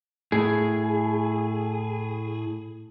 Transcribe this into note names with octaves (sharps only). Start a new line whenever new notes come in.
A2 G#4